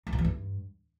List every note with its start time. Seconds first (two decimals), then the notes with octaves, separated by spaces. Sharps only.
0.07 G2
0.13 B2
0.19 E2
0.25 G2